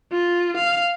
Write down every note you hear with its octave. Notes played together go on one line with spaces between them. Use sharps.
F4
F5